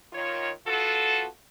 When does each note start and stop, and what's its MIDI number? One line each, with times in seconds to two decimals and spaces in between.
0.13 0.50 51
0.13 0.50 65
0.13 0.50 73
0.66 1.26 59
0.66 1.26 65
0.66 1.26 66
0.66 1.26 69